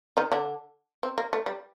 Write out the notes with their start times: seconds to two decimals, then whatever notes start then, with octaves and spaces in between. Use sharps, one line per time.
0.17 D#3 D#4
0.32 D3 D4
1.03 C4
1.18 A#3
1.33 A3
1.46 G3